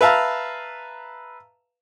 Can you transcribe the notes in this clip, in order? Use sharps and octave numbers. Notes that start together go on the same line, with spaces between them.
B4 E5 F5 A5 A#5